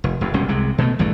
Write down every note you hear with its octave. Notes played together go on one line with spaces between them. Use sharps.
F1
F1 F2
E1 C#2 G3 C#4
C2 C3 G#3
B2 G#3 A3
A#1 G2 E3 A3